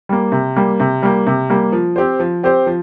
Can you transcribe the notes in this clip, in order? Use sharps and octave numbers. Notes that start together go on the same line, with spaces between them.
G3 A#3
C3
G3 A#3
C3
G3 A#3
C3
G3 A#3
F3
C4 G4 C5
F3
C4 G4 C5
F3